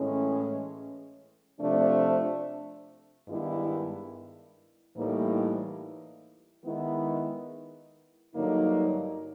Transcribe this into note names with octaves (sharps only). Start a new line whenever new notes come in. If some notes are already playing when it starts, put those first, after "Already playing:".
Already playing: A2 E3 G#3 C#4
C3 F3 A3 D4
G2 D#3 G#3 B3 E4
A2 E3 G3 A#3 D#4
D#3 G#3 B3 E4
G2 D3 F#3 A#3 D#4